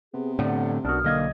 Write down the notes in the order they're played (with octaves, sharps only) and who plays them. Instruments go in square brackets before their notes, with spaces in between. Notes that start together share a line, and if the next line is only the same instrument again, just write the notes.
[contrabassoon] C3 [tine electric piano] B3 [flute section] G#4
[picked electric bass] A2 D3 [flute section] D5 F#5
[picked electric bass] B1 [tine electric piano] D4 F#4 [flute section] A#4 D#6 F6
[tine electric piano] B1 D#5 G#6 [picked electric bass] D3 A#3